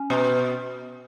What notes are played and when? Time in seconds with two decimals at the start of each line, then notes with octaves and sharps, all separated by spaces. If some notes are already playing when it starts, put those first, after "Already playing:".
Already playing: C#4
0.10 B2